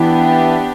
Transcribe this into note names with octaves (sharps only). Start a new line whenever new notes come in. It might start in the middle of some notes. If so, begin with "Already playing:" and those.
Already playing: E3 B3 D4 E4 G4